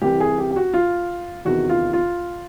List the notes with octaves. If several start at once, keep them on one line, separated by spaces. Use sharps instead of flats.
C2 C3 E3 G4
G#4
G4
G4
F#4
F4
E2 C3 D#3 F#4
F4
F4